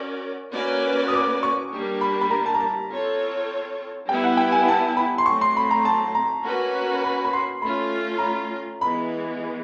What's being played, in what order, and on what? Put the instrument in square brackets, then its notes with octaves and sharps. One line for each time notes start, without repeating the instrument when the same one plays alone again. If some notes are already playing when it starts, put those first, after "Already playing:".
Already playing: [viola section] C#4 F#4 A#4 D5
A#3 C#4 F#4 B4 D5
[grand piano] D#6
D6
C#6
[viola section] G3 A#3 D4 G4 A#4
[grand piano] B5
B5
A#5
A5
A#5
A5
[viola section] C4 F4 A4 C#5
[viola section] G3 B3 E4 [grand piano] G5
[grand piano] F#5
G5
G#5
A5
B5
C6
[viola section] F#3 A3 C4 [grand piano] C#6
[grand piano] C6
B5
A#5
A5
A#5
[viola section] A#3 C#4 F#4 B4
[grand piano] B5
B5
C6
[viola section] A3 C#4 F4 [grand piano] B5
[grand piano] A#5
B5
[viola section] E3 G#3 B3 [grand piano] B5